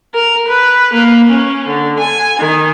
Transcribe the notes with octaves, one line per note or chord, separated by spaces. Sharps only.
A#4
B4
A#3
C#4
D3
G#5
D#3